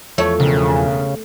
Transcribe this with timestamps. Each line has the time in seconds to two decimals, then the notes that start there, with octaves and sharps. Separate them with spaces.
0.18 E2 F3 A3 C#5
0.40 E1 C#3